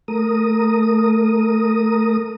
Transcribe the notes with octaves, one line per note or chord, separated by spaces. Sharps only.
A3 A#4 D#6